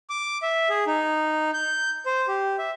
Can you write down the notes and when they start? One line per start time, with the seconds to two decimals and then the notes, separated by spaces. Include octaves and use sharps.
0.10 D6
0.43 E5
0.70 G#4
0.87 D#4
1.54 G6
2.06 C5
2.28 G4
2.58 E5